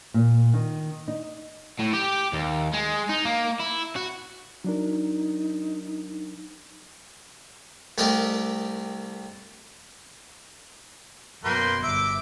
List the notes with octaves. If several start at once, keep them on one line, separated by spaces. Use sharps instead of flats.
A#2
D#3
D#4
A2
G4
D#2
G#3
D#4
A#3
E4
F#4
F#3 D4 D#4 A#4
C2 A3 G4 A#4 D#5 G5
F#2 B2 A#3 B4 G5 C6
G1 E5 D6